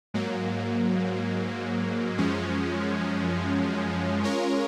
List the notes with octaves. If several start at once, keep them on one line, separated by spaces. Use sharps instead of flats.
G#2 F#3 A#3
F#2 F3 G#3 C#4
G#3 C#4 F4 A#4 C#5